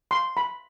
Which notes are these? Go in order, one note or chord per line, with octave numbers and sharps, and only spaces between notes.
C6
B5